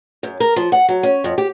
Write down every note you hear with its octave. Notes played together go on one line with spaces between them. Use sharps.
F#2
A#4
F3
F#5
F#3
C#4
F2
G4